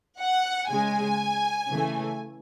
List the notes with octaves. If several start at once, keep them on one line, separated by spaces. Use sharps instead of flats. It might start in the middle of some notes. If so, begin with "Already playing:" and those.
F#5
C#3 G#3 G#5
C#3 E3 A3